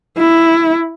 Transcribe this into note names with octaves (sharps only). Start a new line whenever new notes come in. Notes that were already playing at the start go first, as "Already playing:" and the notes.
E4